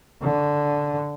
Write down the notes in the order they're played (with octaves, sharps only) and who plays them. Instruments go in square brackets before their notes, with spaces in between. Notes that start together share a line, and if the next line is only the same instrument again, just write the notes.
[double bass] D3